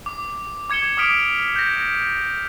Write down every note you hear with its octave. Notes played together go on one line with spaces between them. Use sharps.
D6
D6 G#6 C#7 E7 G7
D6 D#6 F6 B6 D7 F7
G6 A#6